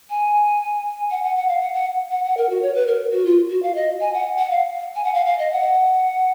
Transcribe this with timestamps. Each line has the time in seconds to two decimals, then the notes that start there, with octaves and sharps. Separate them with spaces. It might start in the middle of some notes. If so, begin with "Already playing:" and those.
0.10 G#5
1.11 F#5
1.23 F#5
1.36 F#5
1.48 F5
1.62 F#5
1.74 F#5
2.11 F#5
2.24 F#5
2.37 A#4
2.50 F#4
2.62 C#5
2.75 B4
2.87 A#4
3.12 F#4
3.25 F4
3.50 F#4
3.63 F5
3.75 D#5
4.01 G#5
4.14 F#5
4.38 F#5
4.51 F5
4.96 G#5
5.04 F#5
5.14 F5
5.26 F5
5.39 D#5
5.52 F#5